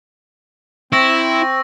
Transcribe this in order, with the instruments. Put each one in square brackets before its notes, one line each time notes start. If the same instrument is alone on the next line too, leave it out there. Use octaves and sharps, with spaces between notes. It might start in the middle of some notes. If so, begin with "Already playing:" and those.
[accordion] C4 [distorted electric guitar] E4 [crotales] C#6 E6 A#6